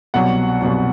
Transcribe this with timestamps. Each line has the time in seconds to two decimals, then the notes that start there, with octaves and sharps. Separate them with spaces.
0.14 C2 B2 F#3 F#5
0.61 C2 B2 F#3